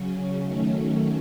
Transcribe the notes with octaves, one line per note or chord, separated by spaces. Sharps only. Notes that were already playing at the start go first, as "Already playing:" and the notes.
Already playing: C#3 F#3 C#4
D#3 F#3 A3 C#4